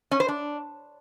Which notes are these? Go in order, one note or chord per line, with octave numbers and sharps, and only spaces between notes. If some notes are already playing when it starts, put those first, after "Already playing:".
C#4
C5
D4